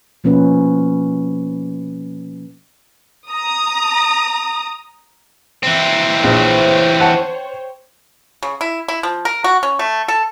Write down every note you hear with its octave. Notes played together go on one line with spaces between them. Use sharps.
B2 F3 A#3 C#4 D#4 B4
A#5 D#6
E3 C4
A#1 C5 C#5 G5
F#5 A5
C#3
E4
E4
F3
A#4
F#4
C#4
A3
A4